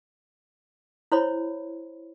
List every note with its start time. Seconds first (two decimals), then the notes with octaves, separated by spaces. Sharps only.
1.12 E4 C5 C#5 B5